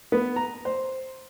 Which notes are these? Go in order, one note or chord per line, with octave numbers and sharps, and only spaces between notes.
B3
A#5
C5